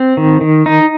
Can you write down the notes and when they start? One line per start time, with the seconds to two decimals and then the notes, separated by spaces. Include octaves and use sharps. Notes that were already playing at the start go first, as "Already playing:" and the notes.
Already playing: C4
0.17 D#3
0.41 D#3
0.66 D#4